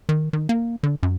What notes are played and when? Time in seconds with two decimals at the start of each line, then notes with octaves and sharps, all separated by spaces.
0.09 D#3
0.33 D#3
0.49 A#3
0.83 D3
1.03 F#2